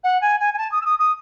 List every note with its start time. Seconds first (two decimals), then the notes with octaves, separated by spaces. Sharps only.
0.04 F#5
0.21 G#5
0.40 G#5
0.54 G#5
0.58 A5
0.71 D#6
0.81 E6
0.85 D#6
0.99 D#6